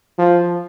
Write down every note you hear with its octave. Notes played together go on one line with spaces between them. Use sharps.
F3